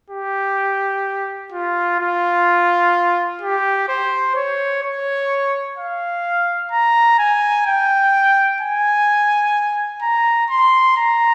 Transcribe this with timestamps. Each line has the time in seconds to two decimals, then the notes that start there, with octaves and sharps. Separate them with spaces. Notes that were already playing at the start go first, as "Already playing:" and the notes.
0.10 G4
1.52 F4
1.99 F4
3.42 G4
3.89 C5
4.36 C#5
4.83 C#5
5.78 F5
6.72 A#5
7.19 G#5
7.66 G5
8.61 G#5
10.02 A#5
10.50 C6
10.97 A#5